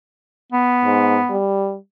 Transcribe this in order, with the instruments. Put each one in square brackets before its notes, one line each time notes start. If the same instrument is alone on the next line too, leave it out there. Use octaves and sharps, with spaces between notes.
[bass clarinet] B3
[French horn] G#2
G3